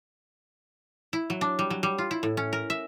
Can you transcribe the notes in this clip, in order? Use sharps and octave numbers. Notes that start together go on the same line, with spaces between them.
E4
F#3
D4
G3
F#3
G3
F4
E4
A2
C#4
A#4
E5